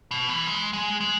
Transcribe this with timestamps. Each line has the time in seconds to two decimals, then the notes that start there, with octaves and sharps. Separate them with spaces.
0.11 B2
0.29 E3
0.47 G#3
0.73 G#3
1.00 G#3